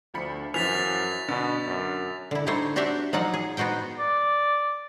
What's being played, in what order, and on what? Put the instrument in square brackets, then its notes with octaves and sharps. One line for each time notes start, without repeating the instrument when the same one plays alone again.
[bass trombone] D2 [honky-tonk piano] F3 B5 C#7
[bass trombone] F#2 [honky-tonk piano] E3 F3 [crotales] A6 B6 F7
[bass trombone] B2 [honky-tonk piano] D3
[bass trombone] F#2
[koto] D3 E4
D3 G3 A3 D#4 C5 C#5
D4 F#4 G4 C5 D5 E5
F3 F#3 D#4 D5 F#5
G#4
B3 D#4 F#4 C5 G5
[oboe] D5